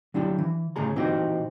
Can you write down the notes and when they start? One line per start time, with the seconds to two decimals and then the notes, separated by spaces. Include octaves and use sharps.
0.14 F#3 D4 E4 G4
0.39 E3
0.76 A2 C#3 A3 G#4 A#5
0.96 A#2 E3 C4 D#4 F#4 G4